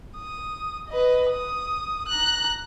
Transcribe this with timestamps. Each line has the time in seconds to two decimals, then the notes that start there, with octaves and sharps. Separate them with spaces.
0.17 D#6
0.88 B4 D#5
1.30 D#6
2.08 A#5 F#6